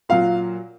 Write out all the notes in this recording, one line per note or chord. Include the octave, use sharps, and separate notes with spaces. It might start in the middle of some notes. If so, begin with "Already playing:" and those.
A#2 F#3 F5